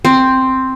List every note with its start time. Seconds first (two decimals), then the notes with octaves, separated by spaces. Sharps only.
0.05 C4